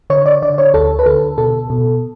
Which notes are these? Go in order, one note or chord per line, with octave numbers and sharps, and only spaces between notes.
D3 C#5
D5
D3 D5
C#5
D2 A4
B4
D3 A4
B2 A4
B2